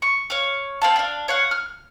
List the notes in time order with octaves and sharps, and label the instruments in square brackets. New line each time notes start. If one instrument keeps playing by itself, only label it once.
[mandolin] C#6
C#5 F5
C4 F5 A5
D4 F5
C#5 F5 F#5
F6